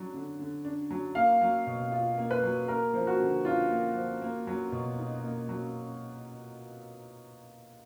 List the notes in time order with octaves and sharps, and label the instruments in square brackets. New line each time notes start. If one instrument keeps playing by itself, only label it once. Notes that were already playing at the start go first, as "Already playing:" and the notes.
Already playing: [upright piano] F#3 D4
D3
D3
D4
F#3
[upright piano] A#3 [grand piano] F5
[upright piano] F#3
B2
F4
A#3
[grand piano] B4
[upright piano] F#3
[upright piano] A#3 [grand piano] A#4
[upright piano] F3
[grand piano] F#4
[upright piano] D3
[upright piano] D4 [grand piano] F4
[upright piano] A#3
F3
A#3
F#3
B2
D#4
A#3
F#3